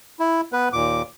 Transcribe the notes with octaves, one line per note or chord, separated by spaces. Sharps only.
E4
B3 B4
D#2 A#2 D6